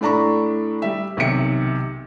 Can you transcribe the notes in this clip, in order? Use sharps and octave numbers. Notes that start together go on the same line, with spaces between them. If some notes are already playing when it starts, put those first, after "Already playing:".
A2 A3 D4 A#5 B5 C#6
G3 E5
B1 C3 D#3 E5 C#7